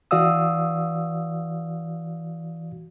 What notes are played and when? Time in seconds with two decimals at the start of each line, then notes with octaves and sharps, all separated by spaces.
0.11 E3 F#4 D5 F5 D#6 E6